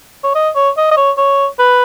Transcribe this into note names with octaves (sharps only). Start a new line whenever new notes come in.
C#5
D#5
C#5
D#5
D#5
C#5
C#5
B4